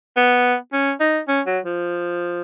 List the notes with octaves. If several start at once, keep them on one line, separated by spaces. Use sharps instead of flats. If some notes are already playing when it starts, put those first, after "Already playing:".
B3
C#4
D#4
C#4
F#3
F3